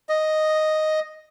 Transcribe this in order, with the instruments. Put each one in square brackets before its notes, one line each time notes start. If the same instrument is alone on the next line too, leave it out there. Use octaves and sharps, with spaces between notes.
[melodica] D#5